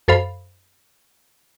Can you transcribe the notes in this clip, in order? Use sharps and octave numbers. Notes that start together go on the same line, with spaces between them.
F#2 A4 C5 F5 B5